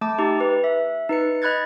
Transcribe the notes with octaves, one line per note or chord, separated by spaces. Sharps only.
A3 A5 D6
D#4 G4
B4
E5
D#4 B4 C#7
D#5 B5 F#6 G#6 A6